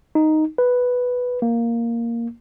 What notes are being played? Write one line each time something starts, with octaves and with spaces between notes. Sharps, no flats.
D#4
B4
A#3